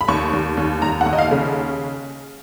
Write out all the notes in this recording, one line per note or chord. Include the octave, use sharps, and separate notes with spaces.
B5
D#2 C#6
D#2
D#2
D#2 A#5
F#5
D#2
D#5
F5
C#3